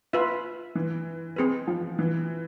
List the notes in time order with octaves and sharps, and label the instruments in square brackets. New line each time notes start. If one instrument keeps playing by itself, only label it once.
[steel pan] F4 B4 E5
[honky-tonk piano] E3
[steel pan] C4 G#4 B4
[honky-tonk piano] F3
E3